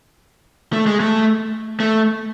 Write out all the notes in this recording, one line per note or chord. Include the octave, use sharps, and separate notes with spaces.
A3
G#3
A3
A3